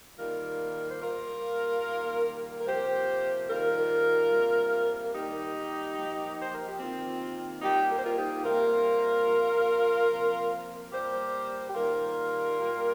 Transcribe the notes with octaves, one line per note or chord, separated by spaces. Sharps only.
D#3 G3 A#3 F4 A#4
C5
A#2 G3 A#3 F4 A#4
D#3 G3 A#3
A#4
C3 F3 A#3 G4 C5
D#3 G3 A#3 F4 A#4
C3 G3 A#3
A#4
D#3 G3 A#3 D#4 G4
A#2 F3 A#3
C5
A#4
G4
D#3 A#3 C4 F4
A#2 G3 A#3 D#4 G4
A#4
C5
F4 A#4
D#4 G4
C3 G3 A#3 F4 A#4
A#2 F3 A#3
C3 F3 A#3
A#2 G3 A#3 G4 C5
G4
D#3 G3 A#3 F4 A#4
A#2 G3 A#3